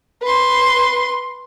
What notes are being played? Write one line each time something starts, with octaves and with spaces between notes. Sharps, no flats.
B4 C6